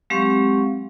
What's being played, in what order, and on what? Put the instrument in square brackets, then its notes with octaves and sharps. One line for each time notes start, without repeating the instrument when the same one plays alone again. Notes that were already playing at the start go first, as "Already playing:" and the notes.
[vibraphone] F#3 G#3 C4 G4 F5 C#6